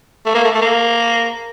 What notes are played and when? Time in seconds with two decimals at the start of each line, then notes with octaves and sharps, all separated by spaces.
0.26 A3
0.35 A#3
0.44 A3
0.55 A3
0.61 A#3